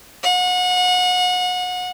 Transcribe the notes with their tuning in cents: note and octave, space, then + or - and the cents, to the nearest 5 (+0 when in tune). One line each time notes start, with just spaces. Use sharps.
F#5 -30